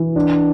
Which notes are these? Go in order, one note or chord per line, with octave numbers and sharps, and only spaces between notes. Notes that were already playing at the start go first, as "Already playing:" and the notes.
Already playing: E3
D4